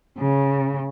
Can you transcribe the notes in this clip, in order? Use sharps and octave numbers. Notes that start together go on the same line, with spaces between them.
C#3